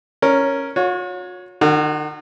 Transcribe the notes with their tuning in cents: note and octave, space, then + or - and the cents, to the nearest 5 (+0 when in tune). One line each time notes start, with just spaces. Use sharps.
C#4 -5 A#4 +0
F#4 -45 C#5 +5
D#3 -45 F#4 +0